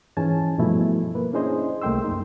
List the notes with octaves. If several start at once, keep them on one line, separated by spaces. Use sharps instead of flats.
G#2 E3 G#3 C#4 G#5 A5
G2 B2 F3 A3 E4
A#3 B4
C#4 D4 E4 G#4 C5 D#5
C2 A3 A#3 G5 C6 E6
F#2 D#4